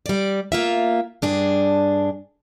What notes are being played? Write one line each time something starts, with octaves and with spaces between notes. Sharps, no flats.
G3 D5
A#3 F4 E5
G2 D4 G#4